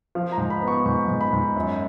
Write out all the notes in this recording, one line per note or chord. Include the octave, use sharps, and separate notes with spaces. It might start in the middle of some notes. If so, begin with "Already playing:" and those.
F3 F5
A#5
G#2
B5
B3
C#6
G#2 C#6
G#2
B5
G#2
F#2